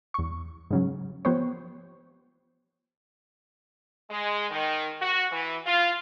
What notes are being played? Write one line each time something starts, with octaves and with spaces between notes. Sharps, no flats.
E2 C#6
G#2 C#3 F#3
F3 B3 G4 C5 C#5
G#3
D#3
F#4
E3
F4